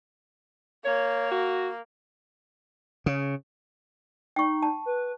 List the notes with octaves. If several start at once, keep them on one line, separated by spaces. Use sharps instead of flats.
A#3 C#5
F#4
C#3
D#4 G5 C#6
A5
B4